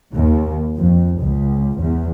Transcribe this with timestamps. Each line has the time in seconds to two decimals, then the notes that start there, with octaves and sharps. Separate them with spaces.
0.14 D#2
0.77 F2
1.19 C#2
1.80 E2